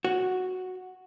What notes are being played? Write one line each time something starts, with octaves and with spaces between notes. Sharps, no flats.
F#4